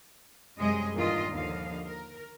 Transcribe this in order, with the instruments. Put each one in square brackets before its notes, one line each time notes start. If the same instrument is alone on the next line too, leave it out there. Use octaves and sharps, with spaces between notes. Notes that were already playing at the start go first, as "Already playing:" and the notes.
[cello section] F#2 C3 G3 G#3 G#4 D#5
E2 G2 A#2 D#3 F4 D#5
D#2 D3 F3 D#5 F5
A#4